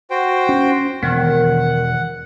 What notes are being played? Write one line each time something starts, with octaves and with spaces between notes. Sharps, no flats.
F#4 C5 G5
C#4
E1 D#3 F#5